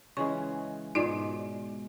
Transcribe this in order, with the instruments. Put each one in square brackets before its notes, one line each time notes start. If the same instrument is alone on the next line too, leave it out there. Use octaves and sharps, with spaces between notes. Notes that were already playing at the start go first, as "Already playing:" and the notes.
[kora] C#3 E3 G#3 [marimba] C#6
[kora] G#2 B2 [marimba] D#4 F4 D5